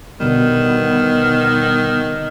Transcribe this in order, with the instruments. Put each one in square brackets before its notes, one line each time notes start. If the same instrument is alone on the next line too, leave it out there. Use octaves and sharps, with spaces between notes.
[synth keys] B2 D3 G3 [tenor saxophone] D#3 [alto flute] B3